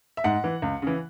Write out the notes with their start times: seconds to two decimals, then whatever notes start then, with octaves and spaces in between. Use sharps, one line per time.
0.17 E5
0.24 G#2 F#5
0.44 E3
0.62 C#2
0.82 C#3 E3